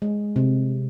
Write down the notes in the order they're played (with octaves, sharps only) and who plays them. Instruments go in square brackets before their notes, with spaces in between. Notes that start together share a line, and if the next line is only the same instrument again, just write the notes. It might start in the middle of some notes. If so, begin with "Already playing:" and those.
[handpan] G#3
C3